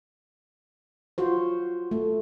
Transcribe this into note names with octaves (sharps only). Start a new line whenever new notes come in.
F4 F#4 C5
A3